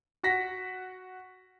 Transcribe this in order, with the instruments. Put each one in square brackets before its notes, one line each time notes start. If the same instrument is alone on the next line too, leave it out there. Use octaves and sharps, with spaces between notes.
[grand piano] F#4 F#5 A#6 B6